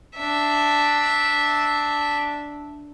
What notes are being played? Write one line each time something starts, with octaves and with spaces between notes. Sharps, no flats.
D4 E5